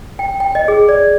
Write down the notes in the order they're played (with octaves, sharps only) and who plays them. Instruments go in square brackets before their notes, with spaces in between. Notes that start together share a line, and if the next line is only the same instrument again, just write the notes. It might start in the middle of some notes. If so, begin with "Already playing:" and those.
[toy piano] G5
G5
D#5
G#4
D5